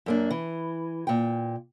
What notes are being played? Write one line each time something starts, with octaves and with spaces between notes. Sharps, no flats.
F#2 A#3 D4
E3
A#2 G5